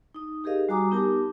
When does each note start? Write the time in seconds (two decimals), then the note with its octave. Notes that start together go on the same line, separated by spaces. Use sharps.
0.14 D#4 D#6
0.44 D#4 G4 G#4 A#4 D#5 F5
0.69 G3 F#4 G#5 A#5 D6 D#6
0.91 B3 D#4 G4 A#4 A5 D6